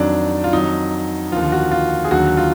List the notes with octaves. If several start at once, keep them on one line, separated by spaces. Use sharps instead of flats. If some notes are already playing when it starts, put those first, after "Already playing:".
Already playing: F2 D#3 F#3 D4
F4
F2 D#3 F#3 D#4
D#2 D3 F3 F4
F4
F#4
F4
G#4
D#2 D3 F#3 F#4
F4